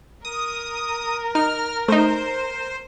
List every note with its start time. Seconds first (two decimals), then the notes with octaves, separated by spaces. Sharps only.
0.25 A#4 D#6
1.35 D#4 F6
1.88 A3 D#4 C5